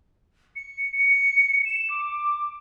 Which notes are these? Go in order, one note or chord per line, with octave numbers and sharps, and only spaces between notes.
C#7
C#7
E7
D6